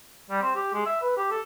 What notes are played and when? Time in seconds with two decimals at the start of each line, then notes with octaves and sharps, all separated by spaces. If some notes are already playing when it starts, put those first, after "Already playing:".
0.30 G3
0.42 C4
0.55 G4
0.74 G#3
0.86 E5
1.02 B4
1.17 G4
1.31 A4